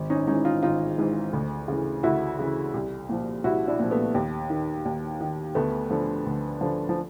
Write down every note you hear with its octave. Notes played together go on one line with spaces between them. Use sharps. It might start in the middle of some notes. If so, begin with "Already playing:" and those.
Already playing: G#1
C#4 D#4
G#2 E3 C#4 D#4
D#4 F4
G#1 D#4 F4
G#2 E3
D2
C#3 E3
D2 E4 F#4
C#3 E3
C2
A#2 F3
C2 E4 F#4
D4 E4
A#2 F3
A3 B3
D#2
D#3
D#2
D#3
D2 A3 B3
D3 F3
D2
D3 F3
F3